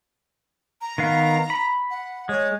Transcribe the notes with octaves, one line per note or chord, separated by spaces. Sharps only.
A#5
D#3 B3 F5
B5
F#5
G#3 C#5